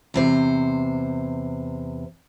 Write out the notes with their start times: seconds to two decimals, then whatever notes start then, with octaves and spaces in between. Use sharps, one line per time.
0.14 E2 C3 C5